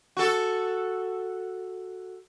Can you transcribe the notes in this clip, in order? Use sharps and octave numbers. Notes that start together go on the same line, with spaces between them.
F#4 A4